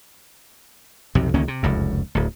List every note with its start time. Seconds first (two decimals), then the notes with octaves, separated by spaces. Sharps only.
1.15 B1 F2 C3
1.34 C#2 D#3 A#3 C#4
1.48 C3
1.63 F1 C#2 F#2
2.15 D1 D2